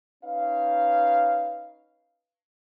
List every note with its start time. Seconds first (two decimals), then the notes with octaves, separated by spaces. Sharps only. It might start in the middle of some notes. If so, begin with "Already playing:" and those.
0.24 C#4 D#4 B4 F5